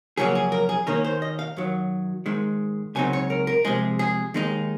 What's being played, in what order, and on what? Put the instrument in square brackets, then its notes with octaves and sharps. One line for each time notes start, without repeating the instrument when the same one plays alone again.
[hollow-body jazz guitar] F2 C#3 F#3 A#3 C#4 G#4
G#4
A#4
G#4
D#2 D#3 A#3 C#4 A#4
C5
D#5
F5
F#2 D#3 F#3
G#2 D#3 G#3
C#2 C#3 F#3 C4 D#4 G#5
C#5
A#4
A#4
C3 F3 G#3 G#4
G#4
D#2 D#3 G#3 D#4